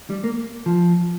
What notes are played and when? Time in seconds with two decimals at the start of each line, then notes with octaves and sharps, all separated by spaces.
0.10 G3
0.24 A#3
0.66 F3